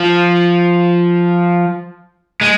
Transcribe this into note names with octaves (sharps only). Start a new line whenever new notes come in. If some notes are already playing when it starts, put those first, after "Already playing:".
Already playing: F3
G#3